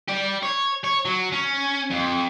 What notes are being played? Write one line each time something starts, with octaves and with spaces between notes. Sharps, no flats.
G4 D5
C#5
C#5
F#3
C#4
F2